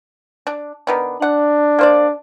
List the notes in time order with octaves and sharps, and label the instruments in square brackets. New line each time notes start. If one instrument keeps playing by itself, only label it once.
[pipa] D4
D#3 B3 D4
[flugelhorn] D4 [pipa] F#5
[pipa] A#3 C5 D5